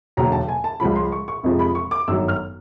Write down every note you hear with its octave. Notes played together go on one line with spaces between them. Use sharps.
E1 D#2 D3 F#3 A#5
A5
G#5
A5
C#2 C#3 F3 B5
C6
C#6
C#6
F1 F2 C3 F3 G#3
B5
C#6
D6
G1 F#2 D#3 F#3 E6
F6